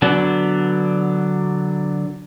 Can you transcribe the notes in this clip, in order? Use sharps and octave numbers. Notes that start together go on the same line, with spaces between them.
D3 F#3 B3 D4